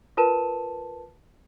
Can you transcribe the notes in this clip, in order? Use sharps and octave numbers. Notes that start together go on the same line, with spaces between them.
F4 A#4 B4 A5 D#7 E7